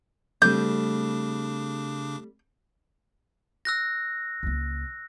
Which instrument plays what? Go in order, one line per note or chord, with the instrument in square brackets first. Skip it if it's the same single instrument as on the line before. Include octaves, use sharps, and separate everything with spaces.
[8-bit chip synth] C#3 D4 D6 [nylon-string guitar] G3 A3 C4 [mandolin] G6
[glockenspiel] E6 F#6 A#6
[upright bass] C#2 A#3